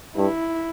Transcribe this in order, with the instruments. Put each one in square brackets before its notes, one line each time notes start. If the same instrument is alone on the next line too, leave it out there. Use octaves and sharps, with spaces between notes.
[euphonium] G2 [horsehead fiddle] E4